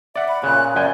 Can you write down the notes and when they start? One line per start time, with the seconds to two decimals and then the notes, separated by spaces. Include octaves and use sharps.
0.16 D5 E5 F#5
0.28 B5
0.43 A#2 C#3 F#6
0.76 F#2 D5 G5 G#5